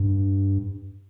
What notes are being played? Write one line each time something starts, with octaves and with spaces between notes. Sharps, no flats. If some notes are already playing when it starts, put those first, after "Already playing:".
Already playing: G2